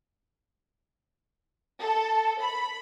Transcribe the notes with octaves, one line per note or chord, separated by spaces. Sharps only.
A4
B5